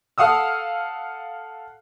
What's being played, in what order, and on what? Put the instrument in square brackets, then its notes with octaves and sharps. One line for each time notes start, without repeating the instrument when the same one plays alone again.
[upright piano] A4 F5 F#5 D#6 E6